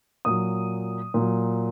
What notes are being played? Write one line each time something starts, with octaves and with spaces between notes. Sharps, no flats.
A#2 F#3 D#6
A#2 F#3